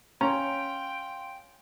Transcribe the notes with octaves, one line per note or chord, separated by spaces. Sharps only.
C#4 F5 G5 A#5 C6 F7